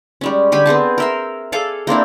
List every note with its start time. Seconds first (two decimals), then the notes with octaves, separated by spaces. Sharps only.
0.21 G3 G#3 C#4
0.52 D3 G4 G#5 B5
0.66 B3 C4 G#4 A5
0.98 A#4 E5 C6
1.52 G#4 A4 F5 D6
1.87 A#3 C4 D4 E4